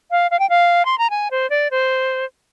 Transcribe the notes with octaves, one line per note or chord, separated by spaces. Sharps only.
F5
F5
G5
F5
C6
A#5
G#5
C5
D5
C5